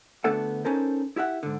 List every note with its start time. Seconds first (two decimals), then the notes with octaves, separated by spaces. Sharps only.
0.24 D2 A3 B3 D4 A4 F#5
0.65 C#4 D#4 A4 A#4 C5
1.16 E4 G4 E5 F#5
1.43 G#2 D3